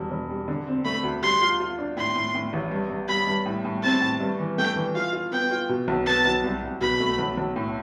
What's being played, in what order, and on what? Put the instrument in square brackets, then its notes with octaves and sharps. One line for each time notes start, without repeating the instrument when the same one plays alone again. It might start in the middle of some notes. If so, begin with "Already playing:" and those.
Already playing: [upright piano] E1 G3
E1
G3
D3
C4
[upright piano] A3 [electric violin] B5
[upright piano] D2
[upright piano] G3 [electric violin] C6
[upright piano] F4
F4
D4
[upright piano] A2 [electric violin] C6
[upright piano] A2
A2
A1
G2
G2
[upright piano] G3 [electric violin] B5
[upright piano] G2
A2
A2
[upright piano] C4 [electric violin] A5
[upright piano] A2
G2
E3
[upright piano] A3 [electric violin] G5
[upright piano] E3
[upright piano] F4 [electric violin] F5
[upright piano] F4
[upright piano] B3 [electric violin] G5
[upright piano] F4
B2
B1
[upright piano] B3 [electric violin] A5
[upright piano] B1
C2
C2
[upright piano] B2 [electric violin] B5
[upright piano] A3
B1
B1
A2